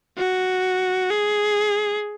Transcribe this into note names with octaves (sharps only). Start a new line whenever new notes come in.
F#4
G#4